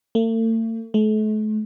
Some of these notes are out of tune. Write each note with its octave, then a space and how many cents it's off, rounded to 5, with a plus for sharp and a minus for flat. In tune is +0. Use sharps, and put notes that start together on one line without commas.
A3 +45
A3 -40